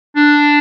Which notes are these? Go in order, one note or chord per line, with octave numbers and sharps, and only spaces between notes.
D4